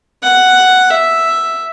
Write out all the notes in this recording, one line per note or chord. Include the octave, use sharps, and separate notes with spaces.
F#5
E5